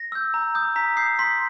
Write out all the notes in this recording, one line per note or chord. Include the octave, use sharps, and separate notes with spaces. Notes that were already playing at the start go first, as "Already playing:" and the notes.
Already playing: A#6
E6 G6
A#5
D#6 G6
A#5 B6
D#6 G6 C7
C6 B6